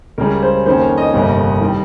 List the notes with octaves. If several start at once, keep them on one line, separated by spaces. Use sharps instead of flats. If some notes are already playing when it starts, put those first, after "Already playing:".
C#2 C#3 G3 C#4 A#4
C5
F2 D#3 A#3 C#4 C5
C#5
D#5
G1 F2 C3 G3 A#3
D#3 G3